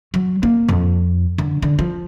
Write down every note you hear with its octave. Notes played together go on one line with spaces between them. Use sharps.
F#3
A#3
F2
D3
D3
F3